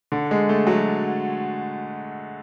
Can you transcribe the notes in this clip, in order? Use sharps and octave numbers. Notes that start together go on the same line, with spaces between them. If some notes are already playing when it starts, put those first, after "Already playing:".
D3
G#3
A3
F#3